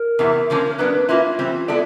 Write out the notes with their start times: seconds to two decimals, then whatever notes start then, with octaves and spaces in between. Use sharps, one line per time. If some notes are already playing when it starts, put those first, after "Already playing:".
Already playing: A#4
0.19 E2 C3 E3
0.50 D3 F3 A#3 C#4
0.79 F#3 B3 D4 B4
1.09 A#3 C#4 E4 F4
1.39 E3 G3 C4
1.68 G#3 B3 E4 A4 D5